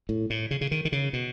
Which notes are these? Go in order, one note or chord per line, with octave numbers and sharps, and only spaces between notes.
A2
A2
C#3
C#3
D#3
D#3
C#3
B2